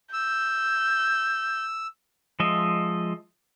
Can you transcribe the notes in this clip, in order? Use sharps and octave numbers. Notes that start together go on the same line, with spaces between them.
E6 G6
F3 G#3 D#5 E5